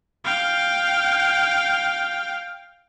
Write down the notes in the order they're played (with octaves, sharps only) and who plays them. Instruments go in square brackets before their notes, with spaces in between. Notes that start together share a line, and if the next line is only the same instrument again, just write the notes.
[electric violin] F5 G5